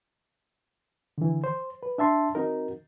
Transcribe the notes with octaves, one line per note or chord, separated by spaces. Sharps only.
D3 E3
C5
B4
D4 E5 A5 C6
C4 D#4 F#4 A#4